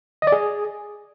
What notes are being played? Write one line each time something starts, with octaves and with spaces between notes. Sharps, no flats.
D#5
D5
G#4